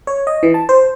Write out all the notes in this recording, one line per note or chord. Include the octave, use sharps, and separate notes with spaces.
C#5
D#5
E3
A5
C5